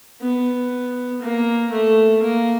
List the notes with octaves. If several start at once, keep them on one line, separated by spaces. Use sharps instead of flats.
B3
A#3
A3
A#3